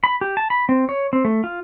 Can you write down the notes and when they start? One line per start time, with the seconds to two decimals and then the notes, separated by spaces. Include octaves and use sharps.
0.04 B5
0.21 G4
0.37 A5
0.50 B5
0.69 C4
0.89 C#5
1.13 C4
1.25 A3
1.44 F4